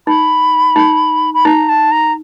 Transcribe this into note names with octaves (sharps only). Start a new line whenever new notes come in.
D#4 B5
D#4
B5
D#4 A#5
A5
A#5